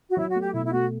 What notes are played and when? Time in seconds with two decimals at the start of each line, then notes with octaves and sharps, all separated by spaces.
0.10 F#4
0.17 F#3 E4
0.29 F#4
0.35 A3
0.41 G4
0.53 B2 E4
0.65 E4
0.73 A3 F#4